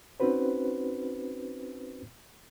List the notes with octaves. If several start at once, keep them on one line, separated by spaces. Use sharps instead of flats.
C4 C#4 D#4 F#4 B4 C5